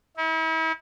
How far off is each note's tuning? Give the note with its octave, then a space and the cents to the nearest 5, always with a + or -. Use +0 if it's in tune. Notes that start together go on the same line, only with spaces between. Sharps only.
E4 -40